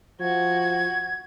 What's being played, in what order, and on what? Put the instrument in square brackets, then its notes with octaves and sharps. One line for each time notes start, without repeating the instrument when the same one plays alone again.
[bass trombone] F3 [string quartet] F#4 [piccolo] G#6